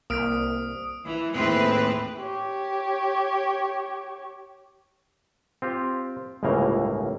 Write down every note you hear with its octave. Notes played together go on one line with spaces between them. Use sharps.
C2 A#3 D#6 F6 D7
E3
D#2 A2 E3 C4 G#4 B4
G4 C#5
C4 F4 G4
G1 C#2 A2 C#3 A#3 A#5